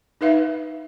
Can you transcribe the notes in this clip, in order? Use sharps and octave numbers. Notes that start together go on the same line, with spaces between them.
D#4 B4 E5 F5